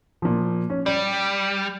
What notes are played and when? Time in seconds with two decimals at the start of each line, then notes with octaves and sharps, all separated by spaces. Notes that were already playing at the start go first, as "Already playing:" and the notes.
0.22 A#2 F3
0.70 C#4
0.86 G3 D5